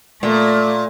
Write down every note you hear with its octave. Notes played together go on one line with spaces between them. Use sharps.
A#2 A3